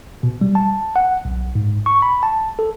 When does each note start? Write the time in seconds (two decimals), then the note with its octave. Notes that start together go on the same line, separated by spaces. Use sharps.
0.23 B2
0.41 G3
0.55 A5
0.96 F#5
1.25 B1
1.55 G#2
1.86 C#6
2.02 B5
2.23 A5
2.59 A4